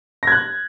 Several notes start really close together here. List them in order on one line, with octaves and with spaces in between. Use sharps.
A#6 G#6 F#6